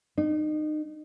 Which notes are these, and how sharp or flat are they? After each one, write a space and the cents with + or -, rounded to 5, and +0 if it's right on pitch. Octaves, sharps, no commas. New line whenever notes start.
D#4 -30